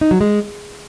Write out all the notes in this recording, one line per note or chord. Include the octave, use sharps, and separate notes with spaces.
D#4
F#3
G#3